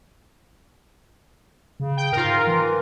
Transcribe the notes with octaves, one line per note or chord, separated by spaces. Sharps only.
C#3
G5
G#2 F4 A#4
E3